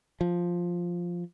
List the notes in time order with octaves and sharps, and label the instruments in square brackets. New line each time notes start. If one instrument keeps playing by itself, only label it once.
[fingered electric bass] F3